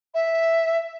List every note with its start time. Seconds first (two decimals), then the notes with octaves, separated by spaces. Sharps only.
0.14 E5